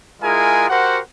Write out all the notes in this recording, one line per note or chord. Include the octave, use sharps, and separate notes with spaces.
G#3 E4 F4 G#4 A#4 G#5
F#4 G4 A#4 C5 F#5